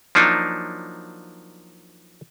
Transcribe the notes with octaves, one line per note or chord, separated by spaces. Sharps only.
F3 F#3 A#3 D4 D#4